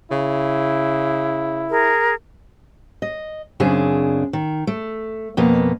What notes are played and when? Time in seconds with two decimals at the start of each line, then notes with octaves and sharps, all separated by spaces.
0.11 C#3 E4
1.69 G#4 A#4
3.02 D#5
3.60 F#2 C#3 C4 D4 G#4
4.33 D#3
4.67 A3
5.37 F2 B2 A#3 B3